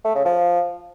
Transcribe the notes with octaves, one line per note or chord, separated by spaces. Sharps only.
A3
C#3
F3